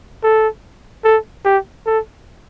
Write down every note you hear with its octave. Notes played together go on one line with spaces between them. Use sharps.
A4
A4
G4
A4